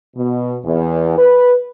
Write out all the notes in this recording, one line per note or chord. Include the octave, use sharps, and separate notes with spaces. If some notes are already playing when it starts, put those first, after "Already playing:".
B2
E2
B4